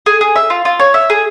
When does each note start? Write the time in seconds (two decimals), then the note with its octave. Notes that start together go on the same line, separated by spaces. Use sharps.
0.06 G#4
0.21 G#4
0.36 E5
0.50 F4
0.65 F4
0.79 C#5
0.94 E5
1.10 G#4